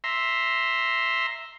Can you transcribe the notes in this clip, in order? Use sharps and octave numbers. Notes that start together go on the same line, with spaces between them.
E5 A#5 C6